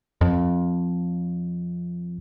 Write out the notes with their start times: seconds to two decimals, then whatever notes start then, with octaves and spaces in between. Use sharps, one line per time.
0.21 F2